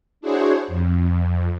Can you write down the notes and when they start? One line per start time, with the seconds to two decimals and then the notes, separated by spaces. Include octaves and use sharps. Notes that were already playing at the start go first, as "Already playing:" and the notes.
0.21 D4 E4 F#4 G#4 C5 C#5
0.68 F2